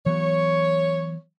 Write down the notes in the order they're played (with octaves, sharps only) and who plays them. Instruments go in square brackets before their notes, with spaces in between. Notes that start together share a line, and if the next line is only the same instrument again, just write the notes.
[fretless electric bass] E3 F#3 B3 [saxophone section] C#5